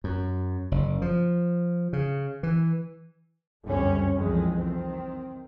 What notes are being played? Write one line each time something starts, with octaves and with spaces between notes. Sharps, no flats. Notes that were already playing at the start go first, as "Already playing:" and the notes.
F#2
F#1
F3
C#3
E3
G1 C#2 F#2 G3 C4 C#4
C2 F2 D#3 E3 G#3
D#3 C4